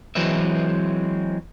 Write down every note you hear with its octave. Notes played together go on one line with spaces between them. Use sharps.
E3 F#3 G#3 C4 B4 E5